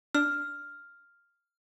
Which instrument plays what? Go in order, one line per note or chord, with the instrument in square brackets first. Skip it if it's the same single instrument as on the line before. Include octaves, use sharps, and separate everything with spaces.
[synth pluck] D4 [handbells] F6